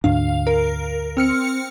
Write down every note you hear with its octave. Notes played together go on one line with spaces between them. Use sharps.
D2 G#2 D4 F5
A#4
C4 F6 C#7